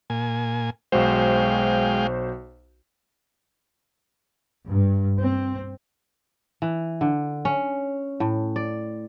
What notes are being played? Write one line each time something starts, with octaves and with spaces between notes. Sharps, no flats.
A#2 G#5
B1 G#3 F#4 C5 F5 G5
G2
C4
E3
D3
C#4
A2
D5